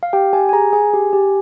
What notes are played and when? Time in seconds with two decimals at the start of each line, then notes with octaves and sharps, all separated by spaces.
0.03 F5
0.13 G4 G5
0.33 G4 G#5
0.49 G#5
0.53 G#4 A#5
0.73 G#4 G#5
0.94 G4
1.13 G4